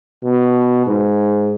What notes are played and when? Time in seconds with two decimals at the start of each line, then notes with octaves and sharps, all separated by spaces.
0.23 B2
0.86 G#2